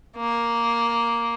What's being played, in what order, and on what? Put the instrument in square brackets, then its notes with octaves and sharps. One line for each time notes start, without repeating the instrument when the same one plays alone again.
[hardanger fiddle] A#3